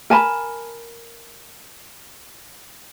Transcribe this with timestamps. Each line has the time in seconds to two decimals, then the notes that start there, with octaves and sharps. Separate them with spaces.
0.10 A#4 G#5 A5 B5